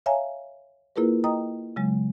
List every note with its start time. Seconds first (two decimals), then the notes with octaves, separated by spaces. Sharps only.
0.06 C#5 E5 F5 G#5 A#5
0.96 A#3 E4 F4 G#4 A#4 B4
1.24 D#5 G5 A#5 D#6
1.76 C#3 F#3 G#3